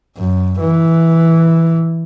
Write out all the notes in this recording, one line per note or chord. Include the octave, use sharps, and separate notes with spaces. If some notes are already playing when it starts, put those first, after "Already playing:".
F#2
E3